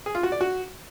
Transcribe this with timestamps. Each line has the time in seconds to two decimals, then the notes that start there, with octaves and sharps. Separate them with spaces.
0.06 G#4
0.15 F4
0.23 F#4
0.32 D5
0.41 F#4